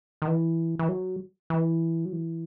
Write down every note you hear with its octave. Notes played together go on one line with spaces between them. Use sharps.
D#3
E3
E3
F#3
E3
F#3
E3